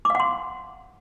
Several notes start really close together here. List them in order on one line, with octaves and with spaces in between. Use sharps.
D6 F5 F#5 C6